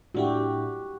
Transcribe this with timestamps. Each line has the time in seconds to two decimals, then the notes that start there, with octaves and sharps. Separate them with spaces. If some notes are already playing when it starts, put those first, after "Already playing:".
0.15 A2 D4 E4 F#4 G4